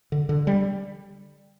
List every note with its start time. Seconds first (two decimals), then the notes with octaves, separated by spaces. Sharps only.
0.12 D3
0.29 D3
0.47 G3